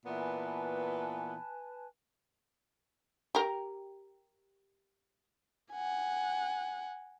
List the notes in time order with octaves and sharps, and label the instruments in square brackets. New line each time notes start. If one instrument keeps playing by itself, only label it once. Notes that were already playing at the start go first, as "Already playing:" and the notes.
[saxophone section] A#2 E3 B3 [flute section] B4 G#5 A5
[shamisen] G4 A#4
[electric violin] F#5 G#5